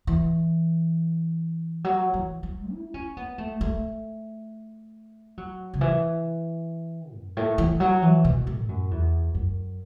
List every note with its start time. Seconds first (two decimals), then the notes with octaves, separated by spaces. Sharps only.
0.07 E3
1.84 F#3
2.14 E3
2.43 F#3
2.72 E4
2.94 C#4
3.17 B3
3.38 A3
3.61 A3
5.38 F#3
5.74 C#3
5.81 E3
7.14 F#2
7.37 A2
7.58 E3
7.80 F#3
8.02 E3
8.25 B2
8.47 A2
8.69 F#2
8.91 E2
9.35 F#2